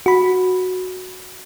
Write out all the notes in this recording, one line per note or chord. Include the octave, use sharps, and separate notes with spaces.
F#4 B5